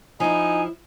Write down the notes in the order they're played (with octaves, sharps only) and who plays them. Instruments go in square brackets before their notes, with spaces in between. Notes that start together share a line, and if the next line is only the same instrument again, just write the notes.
[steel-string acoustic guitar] F3 E4 [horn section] D#4 [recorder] G#5